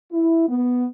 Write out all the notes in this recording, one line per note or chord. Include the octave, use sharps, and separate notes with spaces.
E4
B3